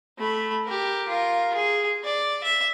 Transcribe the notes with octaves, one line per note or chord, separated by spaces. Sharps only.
A3 B5
G4 A#4
F4 A#4
G#4
D5
E5